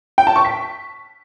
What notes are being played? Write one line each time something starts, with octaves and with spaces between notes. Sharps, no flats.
G5
A5
C#6
B6